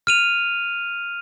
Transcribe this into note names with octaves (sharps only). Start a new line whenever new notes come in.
F6 D#7 F7